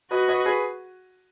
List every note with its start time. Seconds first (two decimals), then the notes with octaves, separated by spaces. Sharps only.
0.11 F#4 B4 D#5
0.28 B4 D#5
0.45 G#4 B4